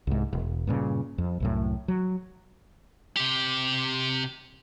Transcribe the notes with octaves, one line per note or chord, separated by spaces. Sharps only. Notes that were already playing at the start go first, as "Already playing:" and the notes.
C2 G#2
E1
G2 A#2 C#3
F2
C2 F#2 A2
F#3
C3 G4